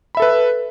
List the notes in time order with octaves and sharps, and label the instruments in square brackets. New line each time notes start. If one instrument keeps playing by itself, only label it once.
[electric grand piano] B5
E5
A4
B4